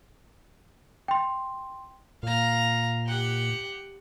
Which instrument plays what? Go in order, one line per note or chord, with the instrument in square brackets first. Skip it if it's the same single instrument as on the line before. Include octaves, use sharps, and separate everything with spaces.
[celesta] G5 C6
[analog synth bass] A#2 [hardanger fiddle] F5 A#5
[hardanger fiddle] G4 F#5